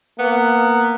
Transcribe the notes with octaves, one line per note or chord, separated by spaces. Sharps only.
A#3 B3